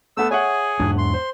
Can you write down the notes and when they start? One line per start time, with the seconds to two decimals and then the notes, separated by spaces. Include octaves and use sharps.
0.17 A3 B3 A4 E6
0.31 G#4 C#5 E5 F#5 G#5
0.80 E2 G#2 D4
0.98 C6
1.14 C5